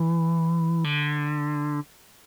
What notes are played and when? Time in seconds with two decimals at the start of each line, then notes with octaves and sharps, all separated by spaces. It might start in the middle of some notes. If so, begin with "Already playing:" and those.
Already playing: E3
0.84 D3